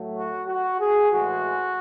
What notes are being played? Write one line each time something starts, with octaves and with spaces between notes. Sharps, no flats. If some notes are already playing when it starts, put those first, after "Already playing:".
Already playing: A2 F#3 A3
F#4
F#4
G#4
A2 E3 G#3 F#4